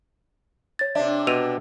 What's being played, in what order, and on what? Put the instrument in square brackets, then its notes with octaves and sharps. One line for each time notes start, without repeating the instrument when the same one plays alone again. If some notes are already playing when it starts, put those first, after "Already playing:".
[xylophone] C#5 A6
[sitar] C3 D4 [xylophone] D5 E5
[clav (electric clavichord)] B2 [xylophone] E6 D#7 F7